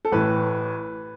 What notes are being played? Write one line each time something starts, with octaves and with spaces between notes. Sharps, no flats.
A4
A1 A2 E3 B4